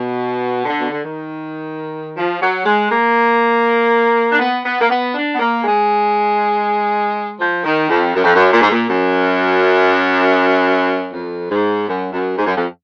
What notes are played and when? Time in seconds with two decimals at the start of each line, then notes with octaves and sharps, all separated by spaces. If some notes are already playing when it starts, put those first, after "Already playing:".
Already playing: B2
0.65 D3
0.79 B2
0.91 D3
1.03 D#3
2.15 F3
2.40 F#3
2.65 G#3
2.90 A#3
4.32 D4
4.39 B3
4.65 B3
4.81 A#3
4.89 B3
5.14 D4
5.34 B3
5.39 A#3
5.64 G#3
7.38 F3
7.64 D#3
7.88 F2
8.14 F#2
8.24 F2
8.34 F#2
8.51 A#2
8.61 G#2
8.71 A#2
8.88 F#2
11.13 F2
11.50 G#2
11.88 F#2
12.12 F#2
12.37 G#2
12.46 F#2
12.56 F2